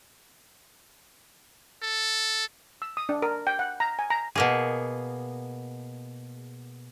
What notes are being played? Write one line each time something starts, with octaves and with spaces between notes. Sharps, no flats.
A4
E6
D#6
D4
A#4
G5
F#5
A#5
G#5
A#5
B2 A#3 G#4